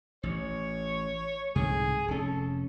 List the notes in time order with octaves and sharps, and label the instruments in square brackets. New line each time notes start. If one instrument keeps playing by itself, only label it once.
[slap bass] A1 [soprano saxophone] C#5
[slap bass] C2 G#2 D3 [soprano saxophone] G#4
[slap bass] F1 C#4 [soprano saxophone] A4